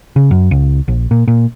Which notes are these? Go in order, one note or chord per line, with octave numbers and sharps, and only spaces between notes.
C#3
F#2
C#2
A#1
A#2
A#2